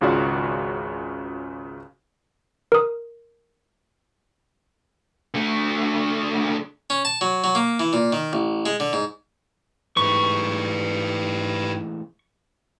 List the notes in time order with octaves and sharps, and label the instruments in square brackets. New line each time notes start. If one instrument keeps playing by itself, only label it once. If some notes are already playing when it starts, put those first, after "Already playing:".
[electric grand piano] G#1 C#2 C#3 F4 F#4 D5
[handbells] A#4 D#6
[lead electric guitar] D3 A3
[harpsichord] C#4
A5
F#3
F#3
A#3
E3
A#2
D#3
A1
G#3
D3
G#2
[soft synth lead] G#2 [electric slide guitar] E3 G#3 A3 [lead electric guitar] G4 B4 [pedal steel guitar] C#6